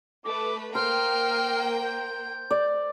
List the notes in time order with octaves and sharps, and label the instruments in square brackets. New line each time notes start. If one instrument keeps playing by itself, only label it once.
[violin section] A3 B4 [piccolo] D6
[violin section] A#3 G5 [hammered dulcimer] C5 [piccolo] F6
[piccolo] G6
[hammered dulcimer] D5